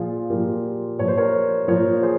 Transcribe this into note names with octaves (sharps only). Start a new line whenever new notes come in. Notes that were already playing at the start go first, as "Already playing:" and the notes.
Already playing: A#2 F3 F4 G#4
A#2 F3 G4 A#4
A#2 F3 C#5
C5
A#4 C#5
A#2 F3 A#4 C#5
G#4 C5